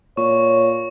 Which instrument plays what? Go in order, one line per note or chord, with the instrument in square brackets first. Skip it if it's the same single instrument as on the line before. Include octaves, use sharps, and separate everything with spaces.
[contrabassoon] A#2 [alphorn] C#5 [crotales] C#6